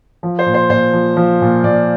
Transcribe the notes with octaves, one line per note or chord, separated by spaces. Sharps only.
F3
C5
A#2
C5
A#2 C5
F3
F3
A#2
A#2 D5